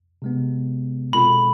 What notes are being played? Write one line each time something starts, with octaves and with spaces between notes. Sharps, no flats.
C3 G#3 B3
B2 G#3 C4 F4 A4 B5